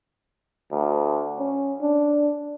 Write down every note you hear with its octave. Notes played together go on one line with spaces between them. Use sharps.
D2
C#4
D4